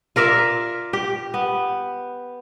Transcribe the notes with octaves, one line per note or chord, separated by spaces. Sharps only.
F4 A#4 D5 E5
G4
B3